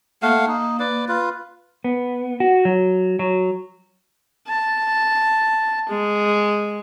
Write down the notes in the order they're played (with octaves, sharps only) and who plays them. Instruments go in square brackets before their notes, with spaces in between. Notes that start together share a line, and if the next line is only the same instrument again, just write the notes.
[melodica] A3 F5 F#5 [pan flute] A#3
[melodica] D#4
B4 D5
F4 B4
[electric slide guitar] B3
F#4
F#3
F#3
[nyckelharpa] A5
G#3